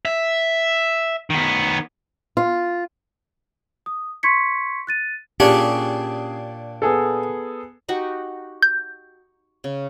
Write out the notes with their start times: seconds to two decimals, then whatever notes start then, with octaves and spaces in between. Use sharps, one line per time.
0.05 E5
1.30 D#3 B3
2.37 F4
3.86 D#6
4.23 C6 C#6 G#6 B6 C#7
4.87 F#6 A6 D#7
5.40 A#2 C#4 D4 G4 G#4 C#5
6.82 B3 G#4 A4
7.89 D#4 F#4 G4
8.62 G6
9.64 C#3